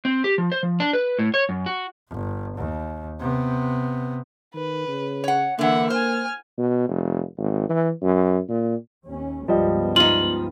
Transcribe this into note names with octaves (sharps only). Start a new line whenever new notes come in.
C4
G4
F3
C5
F3
D4
B4
A2
C#5
F#2
F#4
G1
D#2
C3 B3
D#3 B4
C#3
C#5 F#5
D3 E3 A#3 E5 F#5
C5 G#5 F6
B2
F1
G#1
E3
F#2
A#2
D#2 C#4
C#2 G2 F3 G3 B3 D#5
D#4 F4 F#7